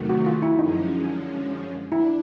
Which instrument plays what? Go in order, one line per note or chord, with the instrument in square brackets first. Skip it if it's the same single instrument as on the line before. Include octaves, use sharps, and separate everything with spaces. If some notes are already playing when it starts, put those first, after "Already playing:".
Already playing: [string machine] E2 C3 D#3 F#3 A3
[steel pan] F#4
F4
E4
[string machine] F#2 D3 F3 G#3 C#4 [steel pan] D#4
[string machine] D4 [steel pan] E4